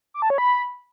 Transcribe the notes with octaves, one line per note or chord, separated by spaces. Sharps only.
D6
A5
C#5
B5